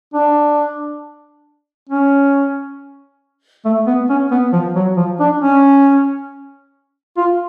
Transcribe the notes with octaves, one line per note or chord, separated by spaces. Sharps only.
D4
C#4
A3
B3
C#4
B3
F3
F#3
F3
D4
C#4
F4